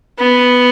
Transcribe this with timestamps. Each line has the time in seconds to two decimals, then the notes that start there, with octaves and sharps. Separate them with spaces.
0.19 B3